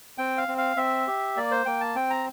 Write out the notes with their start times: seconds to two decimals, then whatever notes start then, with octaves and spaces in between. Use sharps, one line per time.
0.18 C4 G5
0.38 F5
0.48 C4
0.58 F5
0.77 C4 E5
1.07 G4
1.37 A#3 D5
1.51 C5
1.66 A#3 G5
1.81 A5
1.95 C4 G5
2.10 A#5